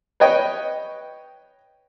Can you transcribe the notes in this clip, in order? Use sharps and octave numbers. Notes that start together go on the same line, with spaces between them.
B4 C#5 D#5 G5